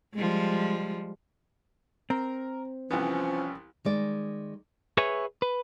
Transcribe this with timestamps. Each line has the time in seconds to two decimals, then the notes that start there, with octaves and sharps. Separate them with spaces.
0.14 F3 G3 G#3
2.10 C4 A#4
2.91 C2 E3 F3 B3 C#4
3.85 D#3 G#3 D5
4.97 G#4 B4 C#5 E5 G#5
5.42 B4